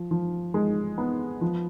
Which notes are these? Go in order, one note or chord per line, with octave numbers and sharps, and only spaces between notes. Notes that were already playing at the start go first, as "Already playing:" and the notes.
Already playing: F3
F3
G#3
B3
F3